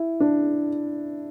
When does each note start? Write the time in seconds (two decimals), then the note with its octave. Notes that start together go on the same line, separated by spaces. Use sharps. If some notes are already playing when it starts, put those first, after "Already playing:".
Already playing: E4
0.20 D4